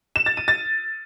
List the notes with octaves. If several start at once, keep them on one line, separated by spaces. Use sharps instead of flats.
E7
A6
D#7
A6